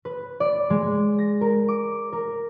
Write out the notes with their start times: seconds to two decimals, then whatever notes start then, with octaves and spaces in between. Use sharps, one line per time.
0.05 B4
0.40 D5
0.70 G#3
1.19 A#6
1.41 A#4
1.68 D6
2.12 A#4